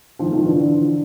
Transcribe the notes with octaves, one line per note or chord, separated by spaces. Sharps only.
D#3 F3
D#3 F3
D3 E3